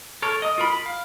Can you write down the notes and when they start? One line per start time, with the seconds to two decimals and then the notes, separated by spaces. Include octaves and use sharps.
0.22 A4 A#4 C#5
0.42 D#5 D#6
0.58 F4 A#4 B5
0.70 B5
0.86 F5